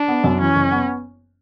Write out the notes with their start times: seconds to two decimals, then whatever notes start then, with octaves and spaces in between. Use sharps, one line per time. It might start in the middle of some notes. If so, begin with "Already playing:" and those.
Already playing: D4
0.08 B3
0.24 F#2
0.40 E3 C#4
0.56 F#1
0.71 B3